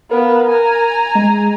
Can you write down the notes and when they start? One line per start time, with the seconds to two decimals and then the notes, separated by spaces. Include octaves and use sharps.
0.11 B3 A#4 F5
0.48 G#5 A#5
1.15 G#3